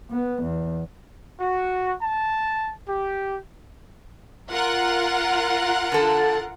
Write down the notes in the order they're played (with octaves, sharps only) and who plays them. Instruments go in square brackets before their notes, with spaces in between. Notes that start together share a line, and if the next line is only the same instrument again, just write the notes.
[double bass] B3
E2
[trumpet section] F#4
A5
G4
[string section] F4 A#4 F#5
[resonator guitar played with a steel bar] D3 A4